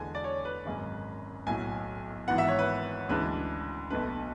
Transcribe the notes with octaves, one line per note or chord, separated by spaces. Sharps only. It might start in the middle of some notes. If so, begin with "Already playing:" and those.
Already playing: E2 D3 G#3 D4 G#5
D5
C#5
B4
G#1 F#2 C#3 G#3 C#4
B1 A2 F#3 G#5
G#1 G#2 E3 B3 F#5
E5
C#5
B4
D2 C#3 E3 G#3 D4 B4
B1 B2 A3 D4 B4